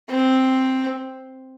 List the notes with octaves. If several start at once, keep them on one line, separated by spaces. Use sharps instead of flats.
C4